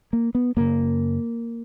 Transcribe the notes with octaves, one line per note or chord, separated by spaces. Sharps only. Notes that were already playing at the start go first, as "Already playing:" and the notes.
A#3
B3
F#2 C#3 A#3